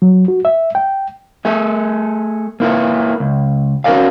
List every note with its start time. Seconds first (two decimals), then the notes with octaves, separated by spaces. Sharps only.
0.02 F#3
0.28 F#4
0.45 E5
0.75 G5
1.45 A3 G#4 E5
2.60 A#3 E4 F4 B4
3.20 C#2
3.84 C#4 F#4 G#4 A#4 D5 F5